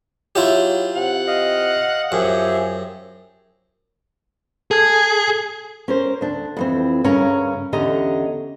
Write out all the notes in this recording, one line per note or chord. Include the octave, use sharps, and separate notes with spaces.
F#3 E4 F4 G4
C3 F#5
D#5 F5
F#2 F3 G4 G#4 E5
G#4 A4 G#6
C#4 A#4 C5
D2 D4
F2 E3 C4
D2 G2 C#3 C#4 A#4 A#5
E2 D3 C#4 G4 D#5 A#5